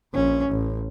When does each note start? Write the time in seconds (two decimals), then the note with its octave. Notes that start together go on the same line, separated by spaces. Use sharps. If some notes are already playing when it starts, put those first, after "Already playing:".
0.14 A#1 C#4
0.50 A1